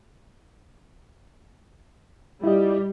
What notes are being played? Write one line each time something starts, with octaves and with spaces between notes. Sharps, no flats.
G3 E4 F4 D#5